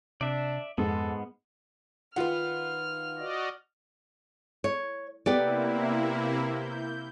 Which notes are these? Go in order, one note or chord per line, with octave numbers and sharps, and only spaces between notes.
C3 D4 D5 E5
F2 G#2 G#3 B3 A4
D#3 F4 B4 F#5 F6
F#4 D5 D#5
C#5
C3 A#3 B3 E4 G4 D5
G6